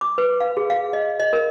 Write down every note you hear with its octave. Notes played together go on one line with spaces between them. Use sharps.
D6
B4
F5
G#4
F5
D#5
D#5
A#4